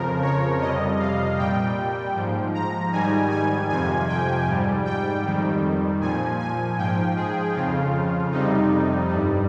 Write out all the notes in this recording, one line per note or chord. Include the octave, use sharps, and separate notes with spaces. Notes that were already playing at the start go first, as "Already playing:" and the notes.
Already playing: F2 C#3 F3 A#4
C#5
F2 C3 G3 D#5
F5
A#2 G3 G5
G#2 F3
A#5
G#2 D#3 G3 G#5
G#5
F2 C3 F3 G#5
G5
G#2 G3
G5
F2 D#3 G3
A#2 F3 G#5
G#5
G#2 F3 G5
G#4
F2 C#3 F3 F4
F2 C3 G3 D#4
G2 G3